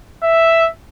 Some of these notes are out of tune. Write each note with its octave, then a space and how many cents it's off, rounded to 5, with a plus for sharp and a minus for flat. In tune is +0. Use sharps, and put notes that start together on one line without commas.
E5 +0